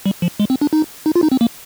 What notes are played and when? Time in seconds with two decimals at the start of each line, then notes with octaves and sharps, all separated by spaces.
0.06 G3
0.22 F3
0.40 G#3
0.50 C4
0.61 D4
0.73 D#4
1.06 D#4
1.16 F4
1.23 D#4
1.32 C4
1.41 A#3